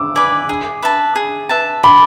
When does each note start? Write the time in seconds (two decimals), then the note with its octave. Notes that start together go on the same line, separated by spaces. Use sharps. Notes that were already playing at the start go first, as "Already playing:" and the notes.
Already playing: D6 E6
0.16 B4 D5 G#5
0.49 G#4
0.82 B4 E5 A5
1.16 G#4
1.49 B4 E5 A5
1.83 D5 B5